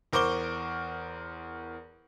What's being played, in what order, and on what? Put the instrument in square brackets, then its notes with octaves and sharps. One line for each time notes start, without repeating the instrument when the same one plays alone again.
[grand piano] E2 A#4 C5 C#6 D6 G7